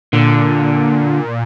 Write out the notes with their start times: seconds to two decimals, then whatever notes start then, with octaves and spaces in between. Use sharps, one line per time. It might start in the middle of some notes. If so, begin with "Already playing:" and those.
0.13 A#2 D3